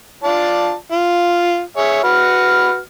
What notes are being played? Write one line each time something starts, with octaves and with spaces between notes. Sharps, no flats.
F4 D5 A5
F4
G#4 C#5 E5
F#4 B4 F6